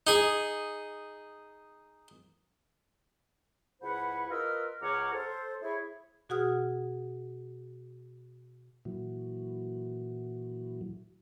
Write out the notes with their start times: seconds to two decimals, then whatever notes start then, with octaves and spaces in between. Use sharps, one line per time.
0.07 D#4 G#4
3.82 C#2 E4 B4 C5 F#5 B5
4.30 F4 A#4 B4 D#5 E6 F6
4.82 C#2 C#5 F#5 A#5 D6 F6
5.12 A4 C5
5.62 E4 G#4 C#5
6.29 B2 F#4 G#4 F#5 D#6 F6
8.85 A#2 E3 F#3